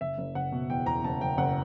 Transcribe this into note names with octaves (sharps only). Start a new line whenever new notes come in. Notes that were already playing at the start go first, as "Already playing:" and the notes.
F#1 E5
F#1
F#1 F#5
B2
E2 G5
E2 A#5
F#1 A5
F#1 G5
F#1 F#5